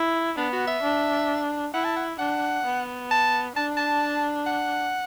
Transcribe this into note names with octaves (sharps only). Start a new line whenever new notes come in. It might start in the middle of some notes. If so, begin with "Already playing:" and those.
Already playing: E4
B3 D4
F#4
E5
D4
E4 F#5
A5
F#5
D4 F#5
B3
A5
D4 A5
A5
F#5